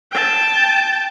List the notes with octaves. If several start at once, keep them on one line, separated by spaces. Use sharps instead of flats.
G5 A5